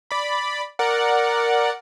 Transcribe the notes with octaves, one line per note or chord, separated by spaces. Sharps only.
D5 B5
A#4 D5 F#5